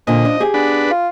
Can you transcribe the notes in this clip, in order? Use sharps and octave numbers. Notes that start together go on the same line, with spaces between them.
A#2 D3 F3 D#5
D4
G4 G#4
B3 D4 B4
F4